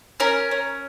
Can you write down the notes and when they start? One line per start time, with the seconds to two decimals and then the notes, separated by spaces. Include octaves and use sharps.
0.20 C#4 A#4
0.51 C#4